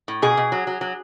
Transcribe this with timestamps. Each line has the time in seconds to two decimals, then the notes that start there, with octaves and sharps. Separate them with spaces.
0.08 A2
0.22 B2 G#4
0.37 B2
0.52 F#3
0.67 F#3
0.81 F#3